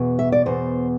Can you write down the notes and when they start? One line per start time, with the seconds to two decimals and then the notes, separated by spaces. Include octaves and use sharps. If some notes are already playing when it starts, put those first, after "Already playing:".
Already playing: E2 B2
0.19 E5
0.32 D5
0.46 E2 B2 C5